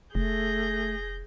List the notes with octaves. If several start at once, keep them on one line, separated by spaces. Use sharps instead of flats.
F1 A3 G#4 G6 A#6